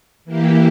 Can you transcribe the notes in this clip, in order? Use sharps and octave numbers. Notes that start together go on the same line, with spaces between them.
E3 A#3 E4 G4